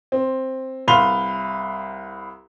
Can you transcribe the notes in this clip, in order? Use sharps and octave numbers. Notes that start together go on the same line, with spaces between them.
C4
C2 B4 F5 C6 F7 G7